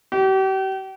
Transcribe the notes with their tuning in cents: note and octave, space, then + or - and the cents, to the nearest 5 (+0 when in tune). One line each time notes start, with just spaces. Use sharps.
G4 -40